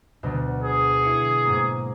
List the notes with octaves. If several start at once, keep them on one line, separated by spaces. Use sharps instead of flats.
D2 B2 F#3
G#4
E4 C#7
G#2 A#3